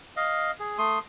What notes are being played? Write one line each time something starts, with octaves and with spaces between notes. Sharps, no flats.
D#5 F5
G#4
A3 C6 D#6